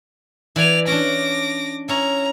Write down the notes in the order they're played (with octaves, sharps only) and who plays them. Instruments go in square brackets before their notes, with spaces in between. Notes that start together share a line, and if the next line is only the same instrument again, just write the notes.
[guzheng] E3 G#5 [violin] D5 F7
[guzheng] C#4 D4 [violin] D6 A#6
[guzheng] C#4 E4 [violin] A#5